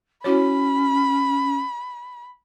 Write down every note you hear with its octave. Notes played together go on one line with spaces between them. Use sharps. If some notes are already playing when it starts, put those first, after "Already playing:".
C#4 E4 F#4 C#5 B5